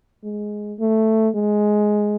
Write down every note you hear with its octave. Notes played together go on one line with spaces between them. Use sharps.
G#3
A3
G#3